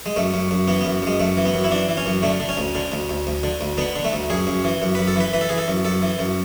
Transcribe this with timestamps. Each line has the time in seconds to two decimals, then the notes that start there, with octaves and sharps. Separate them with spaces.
0.06 G#3
0.16 F#2 A3
0.34 F#2
0.51 F#2
0.68 E3 B3
0.81 F#2 B3
1.02 F#2 G#3
1.20 F#2 A3
1.37 E3
1.45 B3
1.54 F#2
1.64 E4
1.71 E3 D4
1.89 E3
1.97 C#4
2.06 F#2
2.23 D3 A3
2.40 D3
2.49 C#4
2.57 D2
2.75 D3
2.92 D2
3.09 D2
3.27 D2
3.44 D3
3.61 D2
3.78 D3 B3
3.96 D3
4.04 A3
4.13 D2
4.30 F#2 G#4
4.47 F#2
4.64 E3
4.82 F#2
4.95 B4
4.99 F#2
5.07 A4
5.16 E3 B4
5.33 E3 B4
5.41 A4
5.49 E3 G#4
5.58 A4
5.68 F#2
5.85 F#2 A4
6.02 E3
6.19 F#2